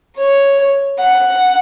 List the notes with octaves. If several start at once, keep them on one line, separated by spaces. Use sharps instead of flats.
C#5
F#5